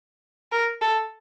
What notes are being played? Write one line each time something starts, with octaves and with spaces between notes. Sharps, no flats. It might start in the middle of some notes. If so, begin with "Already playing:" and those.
A#4
A4